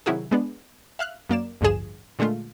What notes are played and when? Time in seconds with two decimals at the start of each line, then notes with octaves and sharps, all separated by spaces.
0.06 C3 D#3 F#3 E4 F#4 G#4
0.31 G#3 B3 D4
0.99 E5 F5 F6 F#6
1.29 F#2 A#3 D5 E7
1.61 A1 D2 G2 F3 G#4 E7
2.19 A#2 D3 G#3 A3 F4